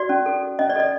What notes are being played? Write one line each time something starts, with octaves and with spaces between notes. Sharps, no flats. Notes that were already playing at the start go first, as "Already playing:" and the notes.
Already playing: F#4 D5
C#4
A4
A4
C#4 D#5
D5
A4 D#5